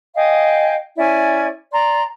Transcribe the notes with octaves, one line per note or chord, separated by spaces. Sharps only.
D#5 F5 G5 G#5
C#4 E4 D5 G#5
D5 A#5 C6